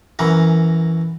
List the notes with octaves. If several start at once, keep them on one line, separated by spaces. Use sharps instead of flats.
F#2 E3 A#4